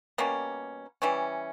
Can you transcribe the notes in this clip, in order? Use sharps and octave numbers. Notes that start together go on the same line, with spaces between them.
B2 G3 A#3 C#4
E3 G3 C#4